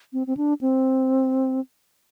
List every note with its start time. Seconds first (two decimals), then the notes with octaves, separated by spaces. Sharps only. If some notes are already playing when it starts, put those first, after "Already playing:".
0.13 C4
0.27 C4
0.37 D4
0.61 C4